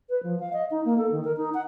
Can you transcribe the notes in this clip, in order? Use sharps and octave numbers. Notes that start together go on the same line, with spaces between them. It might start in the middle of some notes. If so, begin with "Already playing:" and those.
B4
F3
F5
D#5
D#4
A#3
A4
D#3
A#4
D#4
F#5